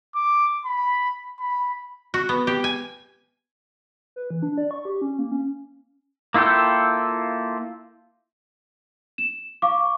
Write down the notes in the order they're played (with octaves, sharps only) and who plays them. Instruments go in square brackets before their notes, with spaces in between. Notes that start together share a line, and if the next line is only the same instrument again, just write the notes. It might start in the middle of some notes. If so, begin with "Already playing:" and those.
[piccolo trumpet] D6
B5
B5
[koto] F#4
B3
G4
G#5
[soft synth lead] B4
E3
D4
D5
C#6
G4
C#4
A#3
C#4
[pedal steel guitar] A#3 E4 F4 A4 G5
[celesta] E7
F5 C#6 D6